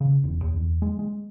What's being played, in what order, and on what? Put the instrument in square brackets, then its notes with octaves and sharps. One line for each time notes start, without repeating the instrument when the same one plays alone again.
[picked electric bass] C#3
E1
D#2
E2
G#3
G#3